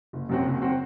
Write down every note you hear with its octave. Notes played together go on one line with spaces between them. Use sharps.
F#1
F#2 F#3 C4 F#4
F#1
F#3 C4 F#4